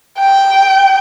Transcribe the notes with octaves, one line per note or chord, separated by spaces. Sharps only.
G5